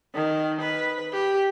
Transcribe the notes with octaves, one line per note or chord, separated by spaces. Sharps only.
D#3
B4
G4